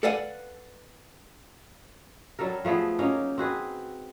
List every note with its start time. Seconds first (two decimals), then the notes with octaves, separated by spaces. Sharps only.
0.03 A4 B4 D5 F5 F#5 G#5
2.39 F#3 G3 A4 A#4
2.65 F3 A3 B3 G#4
2.99 F#3 A#3 C#4 D#4
3.38 C4 F#4 G#4 B4